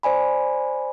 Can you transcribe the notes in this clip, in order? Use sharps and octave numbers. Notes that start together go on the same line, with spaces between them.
C5 D5 G#5 B5